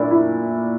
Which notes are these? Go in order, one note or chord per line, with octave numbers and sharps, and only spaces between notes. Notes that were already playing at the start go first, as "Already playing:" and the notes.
Already playing: A#2 A3 D4 E4
E4